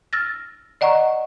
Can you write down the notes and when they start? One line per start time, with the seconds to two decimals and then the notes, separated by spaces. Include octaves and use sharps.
0.13 E6 F6 A6 A#6
0.81 D5 D#5 F#5 A#5 C#6